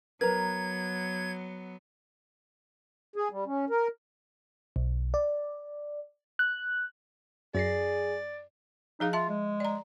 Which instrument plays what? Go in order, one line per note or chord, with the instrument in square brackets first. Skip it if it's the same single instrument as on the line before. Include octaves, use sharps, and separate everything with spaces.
[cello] F#3 B3 [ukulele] A#4 B4 A#5 [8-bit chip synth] G#6
[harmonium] G#4
G3
C#4
A#4
[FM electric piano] B1
D5
F#6
[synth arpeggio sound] F#2 A#6 C7 [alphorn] G#4 [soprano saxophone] D5
[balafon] F3 G#4 F5 [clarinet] D#4
[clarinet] F4 [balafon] E5 A5
[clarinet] G#3
[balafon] D5 A#5